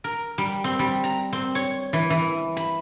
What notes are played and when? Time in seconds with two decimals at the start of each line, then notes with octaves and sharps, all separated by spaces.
0.04 A#4
0.38 G3
0.64 C4
0.79 G3
1.04 A#5
1.33 C4
1.55 C#5
1.93 E3
2.10 E3
2.57 B5